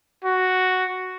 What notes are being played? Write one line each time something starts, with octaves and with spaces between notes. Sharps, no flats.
F#4